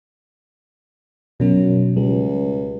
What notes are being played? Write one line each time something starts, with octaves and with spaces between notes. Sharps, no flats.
F#2 B2 F#3
C#2 G3